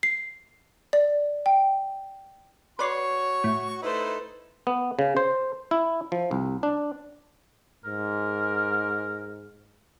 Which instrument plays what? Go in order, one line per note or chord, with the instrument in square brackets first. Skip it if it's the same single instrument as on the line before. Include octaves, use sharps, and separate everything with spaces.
[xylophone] C7
D5
G5
[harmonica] F#4 C#6 [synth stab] B4 D5 C6 [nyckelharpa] C#5
[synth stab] A2
[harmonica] A3 D#4 E4 [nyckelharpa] B4 C5
[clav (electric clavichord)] B3
C#3
C5
E4
F3
C2
D4
[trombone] G#2 [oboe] A#4